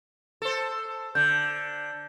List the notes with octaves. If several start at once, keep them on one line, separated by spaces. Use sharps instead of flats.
A4 C5
D3 G6